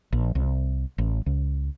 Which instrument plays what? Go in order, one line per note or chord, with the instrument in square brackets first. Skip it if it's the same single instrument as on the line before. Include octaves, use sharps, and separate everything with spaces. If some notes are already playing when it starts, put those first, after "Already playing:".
[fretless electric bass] A#1
C2
A1
C#2